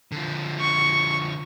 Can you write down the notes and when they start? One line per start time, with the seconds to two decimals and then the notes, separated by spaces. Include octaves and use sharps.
0.12 D3 F3
0.60 C#6